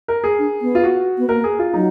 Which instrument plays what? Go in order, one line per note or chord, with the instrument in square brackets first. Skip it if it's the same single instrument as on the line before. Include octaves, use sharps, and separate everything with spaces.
[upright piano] A#4
G#4
[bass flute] D4
B3
[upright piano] F4
F#4
[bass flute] B3
[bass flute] A#3 [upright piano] A#4
[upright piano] G#4
F4
[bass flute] F#3 [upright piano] D#4